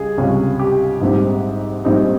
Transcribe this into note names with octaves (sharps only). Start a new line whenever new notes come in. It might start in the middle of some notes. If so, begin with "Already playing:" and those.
Already playing: C#2 G3 C#4 G#4
C#2 C3 G3 C#4 F4 G4
G4
A#1 G#2 G3 C4 D#4
A#1 G#2 G3 C4 D#4